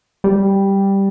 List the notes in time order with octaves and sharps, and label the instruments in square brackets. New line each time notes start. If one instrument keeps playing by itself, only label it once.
[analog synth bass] G3